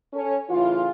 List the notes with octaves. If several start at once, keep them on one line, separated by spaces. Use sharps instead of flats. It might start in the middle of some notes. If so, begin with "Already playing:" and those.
C#4 A4 C#5
A2 C#3 E3 F4